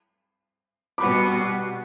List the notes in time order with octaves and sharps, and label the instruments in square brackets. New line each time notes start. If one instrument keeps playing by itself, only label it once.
[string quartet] B2 G3 B3 F#4 [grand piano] B5 D6